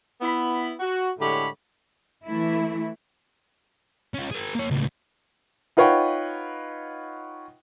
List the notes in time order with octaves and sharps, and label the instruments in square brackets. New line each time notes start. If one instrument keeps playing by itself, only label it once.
[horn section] B3 E4 B5
F#4
A2 D3 G#3 G4 C#5 B5
[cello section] E3 A3 E4
[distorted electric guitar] C#4 F4
G#4 A#4
A#3 C#5
C#2 A2
[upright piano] D#4 F4 B4 C#5 F#5 G5